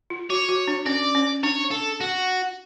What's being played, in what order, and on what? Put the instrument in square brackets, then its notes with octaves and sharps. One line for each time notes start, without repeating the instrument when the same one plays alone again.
[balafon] F4
[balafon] F#4 [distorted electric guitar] C#5
[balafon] F#4
D4
[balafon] C#4 [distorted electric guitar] D5
[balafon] C#4
[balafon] D4 [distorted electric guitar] C#5
[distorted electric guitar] A4
F#4